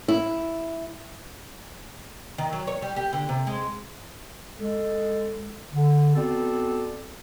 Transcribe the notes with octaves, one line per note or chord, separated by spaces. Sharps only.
E4
D#3
F#3
C#5
G3
G4
D3
C3
G#3
G#3 A4
D3
B3 C4 F#4 A4 D5